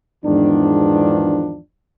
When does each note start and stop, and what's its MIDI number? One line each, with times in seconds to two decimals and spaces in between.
0.25 1.60 40
0.25 1.60 44
0.25 1.60 51
0.25 1.60 53
0.25 1.60 59
0.25 1.60 62